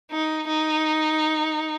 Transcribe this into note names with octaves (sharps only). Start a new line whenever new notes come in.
D#4
D#4